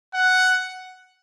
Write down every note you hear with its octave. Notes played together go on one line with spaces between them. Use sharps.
F#5